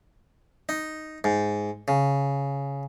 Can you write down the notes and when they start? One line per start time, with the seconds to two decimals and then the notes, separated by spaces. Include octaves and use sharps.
0.69 D#4
1.24 G#2
1.88 C#3